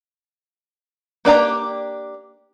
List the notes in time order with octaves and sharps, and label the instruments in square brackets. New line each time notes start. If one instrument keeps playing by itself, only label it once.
[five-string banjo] A#3 D4 G4 A#5